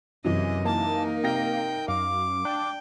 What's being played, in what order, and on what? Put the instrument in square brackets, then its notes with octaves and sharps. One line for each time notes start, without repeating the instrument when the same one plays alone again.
[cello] F#2 D#5 [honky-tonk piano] C3 E3
[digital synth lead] A#3 [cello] D#4 A#4 [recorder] A5
[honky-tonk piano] C3 F5 A#6 [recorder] G5
[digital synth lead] F#2 [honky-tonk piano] F5 [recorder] D6
[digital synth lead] D4 [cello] G5